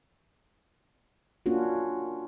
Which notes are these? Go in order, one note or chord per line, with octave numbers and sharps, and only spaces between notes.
A#3 C#4 D4 F4 F#4